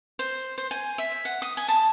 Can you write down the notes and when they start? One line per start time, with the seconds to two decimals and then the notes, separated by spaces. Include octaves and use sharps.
0.19 C5
0.58 C5
0.71 G#5
0.98 E5
1.25 F#5
1.42 D#6
1.57 G#5
1.68 A5